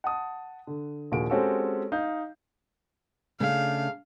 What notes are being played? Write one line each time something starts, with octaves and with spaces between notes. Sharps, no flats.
F#5 A5 D#6
D3
A#1 D#2 A#2 F#4 G#4 D7
G#3 C4 C#4 F#4 G4 A4
D#4 F5 G6
C#3 A3 D4 F5